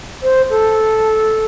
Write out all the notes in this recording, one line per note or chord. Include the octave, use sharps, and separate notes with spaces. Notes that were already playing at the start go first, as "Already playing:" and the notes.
C5
A4